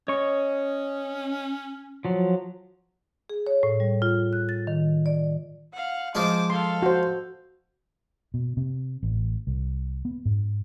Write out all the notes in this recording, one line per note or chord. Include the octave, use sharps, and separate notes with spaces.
C#4 C#5 D#5 C#6
F3 F#3
G#4
C#5
A2
G3
F4
F#6
A6
D#3
D5
F5 F#5
F3 G#3 F4 C5 D6
A4 F5 C6
F#4 C5
B2
C3
A1
C2
B3
G#2